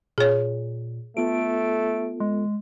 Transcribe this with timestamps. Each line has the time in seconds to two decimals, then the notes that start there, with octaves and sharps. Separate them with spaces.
0.18 A#2 G#4 C#5
1.17 A3 B3 F4 A4 D7
2.20 G#3